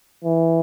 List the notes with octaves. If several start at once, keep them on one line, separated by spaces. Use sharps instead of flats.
E3